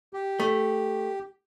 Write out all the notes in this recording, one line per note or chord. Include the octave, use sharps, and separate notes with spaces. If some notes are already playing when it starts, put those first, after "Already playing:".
G4
A3